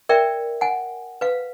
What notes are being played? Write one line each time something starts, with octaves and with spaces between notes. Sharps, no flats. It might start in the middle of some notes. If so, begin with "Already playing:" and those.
A#4 D5 E5 G5
F#5 G#5
B4 F5